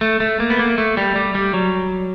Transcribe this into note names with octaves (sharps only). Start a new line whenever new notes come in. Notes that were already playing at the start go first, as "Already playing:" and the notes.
A3
A3
A#3
B3
A#3
A3
G3
G3
G3
F#3